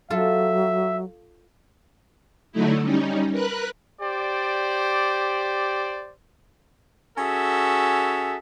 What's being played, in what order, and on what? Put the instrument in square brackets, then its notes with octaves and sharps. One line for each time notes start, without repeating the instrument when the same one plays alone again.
[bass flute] F#3 [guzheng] F4 A4 [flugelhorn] E5
[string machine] D3 F#3 A3 D#4 E4
G3 C#4 D#4
A#4 B4 F#6
[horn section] G4 C5 D5
C#4 F#4 G#4 A4 E5